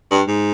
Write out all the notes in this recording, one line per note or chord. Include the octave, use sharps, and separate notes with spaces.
G2
G#2